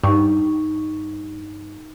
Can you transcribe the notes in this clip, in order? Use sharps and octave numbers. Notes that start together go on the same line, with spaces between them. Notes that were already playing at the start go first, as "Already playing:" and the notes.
G2 D#4 C#6